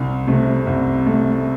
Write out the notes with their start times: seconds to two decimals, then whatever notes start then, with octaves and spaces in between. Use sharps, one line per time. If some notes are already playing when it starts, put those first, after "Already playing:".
Already playing: C2
0.27 C3 A3
0.67 C2
1.06 A3